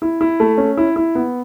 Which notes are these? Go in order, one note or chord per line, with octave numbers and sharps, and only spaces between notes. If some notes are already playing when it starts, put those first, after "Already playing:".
E4
E4
A3
C#4
E4
E4
B3